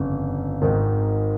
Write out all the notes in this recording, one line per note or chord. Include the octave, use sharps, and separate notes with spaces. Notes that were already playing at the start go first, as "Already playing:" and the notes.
Already playing: G1 F2 C#3
G#1 G#2 D#3